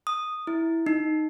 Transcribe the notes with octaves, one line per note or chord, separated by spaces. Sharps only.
D#6
E4
D#4